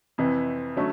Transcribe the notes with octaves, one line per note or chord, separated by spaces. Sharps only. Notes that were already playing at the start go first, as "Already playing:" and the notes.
F2 C3 E3
D3 F#3 A3 C#4